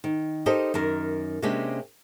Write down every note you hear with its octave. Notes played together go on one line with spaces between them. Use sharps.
D#3
D#4 G4 A4 A#4 C5 D#5
F#2 D#3 A#4
C3 G#3 A#3 C#4 D4 G4